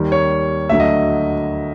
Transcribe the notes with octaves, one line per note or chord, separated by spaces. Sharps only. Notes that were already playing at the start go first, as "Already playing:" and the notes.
Already playing: D#2 D#3 G3
C#5
D2 D3 F#3 A3 E5
D#5